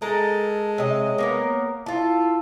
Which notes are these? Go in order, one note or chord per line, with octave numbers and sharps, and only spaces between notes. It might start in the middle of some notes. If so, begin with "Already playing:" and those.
G#3 A4 A#4
C3 C#5 D#5
A#3 B3 A#4
E4 F4 A4